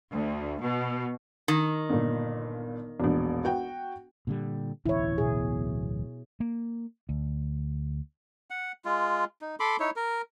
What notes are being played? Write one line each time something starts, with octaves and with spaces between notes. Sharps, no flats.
D2
B2
D#3
G1 A#2
E1 A#1
F#4 G5
A#2 D3 G3
D1 B1 E3 E4 C#5
B2 G#4
A#3
D2
F#5
G#3 F4
D#4
A4 B5 C6 D6
D#4 E4 C#5
A#4